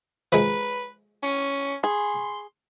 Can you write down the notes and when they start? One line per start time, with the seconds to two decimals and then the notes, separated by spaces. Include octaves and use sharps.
0.32 F3 G#3 B4
1.23 C#4
1.84 G#4 C6